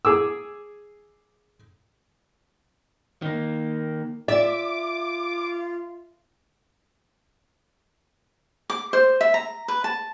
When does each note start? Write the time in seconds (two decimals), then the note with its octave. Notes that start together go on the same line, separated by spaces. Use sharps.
0.05 G#4 D6 E6
3.22 D#3 A#3
4.28 F4 D5 E5 D6 E7
8.70 D6
8.93 C5
9.21 E5
9.34 A#5
9.68 B4
9.84 A5